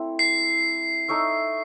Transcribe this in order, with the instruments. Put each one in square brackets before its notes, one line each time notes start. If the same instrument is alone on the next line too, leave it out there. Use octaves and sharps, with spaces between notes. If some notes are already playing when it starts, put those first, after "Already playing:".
Already playing: [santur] A3 C4 E4
[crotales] C7
[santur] D#4 A4 C#5 E5